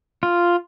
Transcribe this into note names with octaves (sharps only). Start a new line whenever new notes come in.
F4